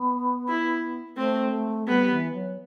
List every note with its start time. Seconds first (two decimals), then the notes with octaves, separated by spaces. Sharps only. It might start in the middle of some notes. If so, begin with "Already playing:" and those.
Already playing: B3
0.48 E4
1.17 A3 C4
1.52 A3
1.87 G3 B3
2.10 E3
2.33 F#3